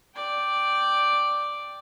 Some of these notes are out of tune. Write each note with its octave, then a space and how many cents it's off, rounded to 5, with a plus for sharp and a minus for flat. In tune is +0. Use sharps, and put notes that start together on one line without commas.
D5 +0 G5 +0